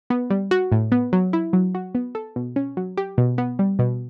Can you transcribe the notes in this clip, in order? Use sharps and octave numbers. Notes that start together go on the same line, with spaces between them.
B3
G3
F#4
A2
B3
F#3
E4
F#3
F#4
B3
A4
B2
C#4
F#3
G4
B2
B3
G3
B2